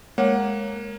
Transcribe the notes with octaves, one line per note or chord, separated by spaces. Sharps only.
G#3 A#3 C#5 F#5